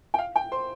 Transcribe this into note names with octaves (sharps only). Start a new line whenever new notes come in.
G5
F5
G5
C5 C6